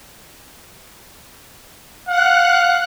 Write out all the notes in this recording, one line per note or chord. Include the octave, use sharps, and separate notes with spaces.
F5 F#5 F#6